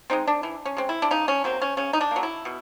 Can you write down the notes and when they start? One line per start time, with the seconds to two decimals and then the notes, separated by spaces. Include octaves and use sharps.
0.10 G#3 C4 D#4
0.27 D4
0.43 E3
0.65 C#4
0.77 G#3 C4
0.89 E4
1.02 D4
1.11 C#3 D#4
1.28 C#4
1.44 F#3 A#3 C4
1.62 C#4
1.77 C#3 C#4
1.93 D#4
2.01 D4
2.11 A#3
2.16 F#3
2.23 E4
2.45 B2